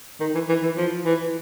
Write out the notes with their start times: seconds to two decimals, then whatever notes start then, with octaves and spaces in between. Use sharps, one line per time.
0.20 D#3
0.35 E3
0.49 E3
0.63 E3
0.77 F3
1.05 E3